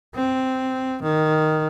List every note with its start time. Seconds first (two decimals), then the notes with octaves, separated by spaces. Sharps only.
0.15 C4
1.03 D#3